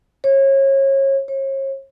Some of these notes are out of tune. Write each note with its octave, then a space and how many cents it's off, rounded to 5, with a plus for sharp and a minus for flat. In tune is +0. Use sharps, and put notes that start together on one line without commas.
C#5 -30
C#5 -40